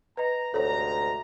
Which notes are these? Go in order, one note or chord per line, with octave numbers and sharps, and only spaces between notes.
B4 D#5 A#5
D2 G#2 C3 A4 C5 C#5 A#5